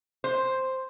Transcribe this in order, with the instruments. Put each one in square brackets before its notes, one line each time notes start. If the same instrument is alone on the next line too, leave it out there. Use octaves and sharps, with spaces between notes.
[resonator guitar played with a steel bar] C5